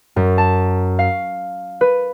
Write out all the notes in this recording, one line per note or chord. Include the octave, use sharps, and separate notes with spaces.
F#2
A5
F5
B4